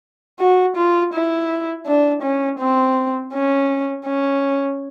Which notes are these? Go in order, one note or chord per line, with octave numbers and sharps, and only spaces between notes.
F#4
F4
E4
D4
C#4
C4
C#4
C#4